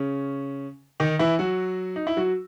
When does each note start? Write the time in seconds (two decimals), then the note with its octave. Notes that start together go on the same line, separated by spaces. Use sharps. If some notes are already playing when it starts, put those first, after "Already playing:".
Already playing: C#3 C#4
1.00 D#3 D#4
1.19 E3 E4
1.39 F#3 F#4
1.96 D#4
2.07 E4
2.17 F#3 F#4